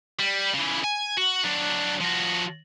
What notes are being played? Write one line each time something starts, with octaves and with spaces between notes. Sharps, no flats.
G3
C#3 E3
G#5
F#4
F#3 D4
F3 F#4